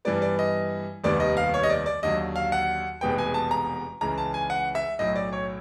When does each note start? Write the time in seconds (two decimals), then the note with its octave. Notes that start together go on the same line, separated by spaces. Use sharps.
0.05 G2 E3 G3 B3 D5
0.22 D5
0.39 D#5
1.04 F1 D#2 D#3 G3 B3 D5
1.20 D#5
1.37 F5
1.54 C#5
1.63 D#5
1.70 D5
1.86 D5
2.03 D#2 D3 F#3 D#5
2.36 F5
2.52 F#5
3.01 F1 E2 B2 G#3 B3 G5
3.18 G#5
3.34 A5
3.51 A#5
4.01 C#2 C#3 E3 A#5
4.18 A5
4.34 G#5
4.50 F#5
4.75 E5
4.99 B1 A2 F#3 D#5
5.15 D5
5.33 C#5